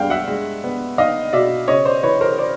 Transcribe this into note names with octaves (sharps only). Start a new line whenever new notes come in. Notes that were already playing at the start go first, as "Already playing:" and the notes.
Already playing: G2 B3 F5 G5
E5 F#5
G#3
B3
D#4 D#5 F5
B2 D5 E5
C#3 C#5 D#5
C5 D5
E3 B4 C#5
A#4 C5
C5 D5